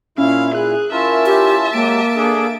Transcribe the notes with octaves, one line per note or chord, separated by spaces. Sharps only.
A#2 C#4 E4 F5
G#4 F#6
C#4 E4 F4 A#4 E5 A5
G4
F#3 G#3 A#3 G4 D7
D4 G#4 A4